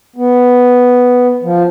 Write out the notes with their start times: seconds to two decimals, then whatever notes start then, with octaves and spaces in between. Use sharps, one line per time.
0.16 B3
1.43 F3